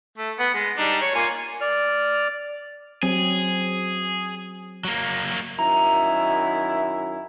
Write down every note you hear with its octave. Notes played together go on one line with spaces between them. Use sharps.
A3
B3
G#3
G3 D4 D#4
C#5
A#3 F4 G#5
D5 F6
F#3 C4 G#4
F#3 A#3
F#2 D#3 E4 A#5